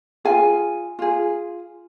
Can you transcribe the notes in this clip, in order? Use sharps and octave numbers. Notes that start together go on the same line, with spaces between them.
F4 G#4 G#5
F4 G#4